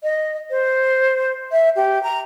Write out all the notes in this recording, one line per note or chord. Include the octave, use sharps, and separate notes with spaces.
D#5
C5
E5
G4
A#5